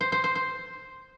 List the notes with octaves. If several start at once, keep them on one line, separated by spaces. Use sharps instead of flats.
C5
C5
C5
C5